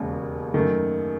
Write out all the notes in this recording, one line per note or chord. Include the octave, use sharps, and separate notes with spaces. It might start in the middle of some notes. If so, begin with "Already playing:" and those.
Already playing: E1 D#2 C#3 G#3
F#2 D#3 A3